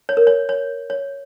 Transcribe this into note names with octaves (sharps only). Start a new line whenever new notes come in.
C#5
A#4
C#5
C#5
C#5